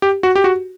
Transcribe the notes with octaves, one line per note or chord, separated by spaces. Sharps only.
G4
F#4
G4
F#4